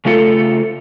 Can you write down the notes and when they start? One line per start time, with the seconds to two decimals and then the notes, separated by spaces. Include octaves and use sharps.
0.05 C#3 A3 F4 A4